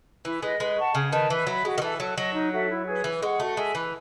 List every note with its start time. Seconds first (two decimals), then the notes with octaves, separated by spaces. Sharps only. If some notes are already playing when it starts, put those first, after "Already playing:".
0.25 E3 E4
0.42 G#3 B4 D#5
0.60 G#3 B4
0.77 F#5 A5 C#6
0.95 C#3 G#4
1.12 D#3 B4 D#5 A5
1.30 E3 B4
1.47 F#3 E5 B5
1.65 G#3 F#4
1.78 D#3
1.82 E3 A4 E5
2.00 F#3 A4
2.17 F#3 D#5 A5 C#6
2.34 D#4
2.52 F#4 A4 E5
2.69 E4
2.87 G#4 B4
3.04 E3 B4
3.22 G#3 F#5 C#6
3.40 A3 F#4
3.57 G#3 A4 E5 G#5
3.74 E3 B4